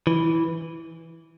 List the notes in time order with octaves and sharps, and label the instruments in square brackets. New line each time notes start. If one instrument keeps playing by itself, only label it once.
[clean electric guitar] E3